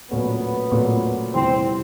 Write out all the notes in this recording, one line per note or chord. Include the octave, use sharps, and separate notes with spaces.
A#2 F#3 A3 B3 C#4
A#2 F#3 A3 C#4
E2 C3 E3 G3 C4